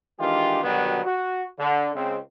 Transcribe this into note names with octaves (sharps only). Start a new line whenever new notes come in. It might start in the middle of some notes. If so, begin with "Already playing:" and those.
D#3 E3 G#3 D4 F4 G4
B2 D3 D#3 F#3 G3 B3
F#4
D3
C#2 G#3 C4